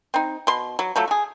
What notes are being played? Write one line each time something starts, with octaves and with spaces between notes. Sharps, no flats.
C4 D#4
B2 C6
F#3
F3 F#3 A3
F#4 G#4